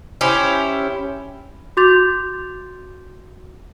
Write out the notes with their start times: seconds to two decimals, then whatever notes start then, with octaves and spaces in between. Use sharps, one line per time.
0.21 C#4 E4 G4 C5
1.77 F#4 C6 D6 G6 A6 F7